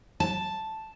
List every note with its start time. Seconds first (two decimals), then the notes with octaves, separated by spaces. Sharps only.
0.20 A5